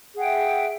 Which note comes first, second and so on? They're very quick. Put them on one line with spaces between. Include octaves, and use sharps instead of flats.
G#4 F#5 G5 E5